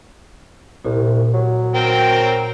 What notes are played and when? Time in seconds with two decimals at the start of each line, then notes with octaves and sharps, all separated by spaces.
0.85 C2 A#2
1.34 F#3
1.75 C4 A#4 G5